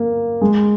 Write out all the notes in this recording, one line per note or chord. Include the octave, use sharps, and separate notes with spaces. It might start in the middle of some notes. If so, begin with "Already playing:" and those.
Already playing: A#3
G#3